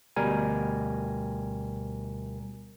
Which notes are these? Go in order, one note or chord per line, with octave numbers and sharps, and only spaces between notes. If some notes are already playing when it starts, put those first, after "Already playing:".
D2 B2 G3 A#4 G#5